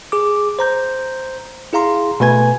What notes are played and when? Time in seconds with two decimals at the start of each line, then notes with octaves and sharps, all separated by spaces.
0.12 G#4 D6
0.59 C5 A#5 G6
1.73 E4 G#4 F5 A#5 C6
2.20 B2 A3 B4 G#5 G#6